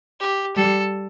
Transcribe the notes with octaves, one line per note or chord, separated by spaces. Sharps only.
G4
G3 A4